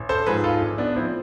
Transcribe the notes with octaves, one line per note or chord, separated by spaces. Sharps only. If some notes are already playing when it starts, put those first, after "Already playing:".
Already playing: A1
A4 C5
G#2 F3 G#4 B4
F4 A4
A1
B3 D4
A2 F3 C4 E4